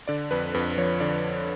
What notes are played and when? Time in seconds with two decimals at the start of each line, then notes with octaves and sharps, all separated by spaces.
0.08 D3 D5
0.31 F2 B4
0.54 F2 B4
0.78 F3 C#5
1.00 D3 D5